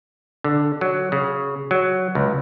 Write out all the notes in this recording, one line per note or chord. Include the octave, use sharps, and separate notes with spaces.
D3
F#3
C#3
F#3
C#2